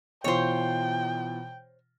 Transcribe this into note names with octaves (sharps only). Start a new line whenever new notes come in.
B2 E3 F4 C5 C#5 G5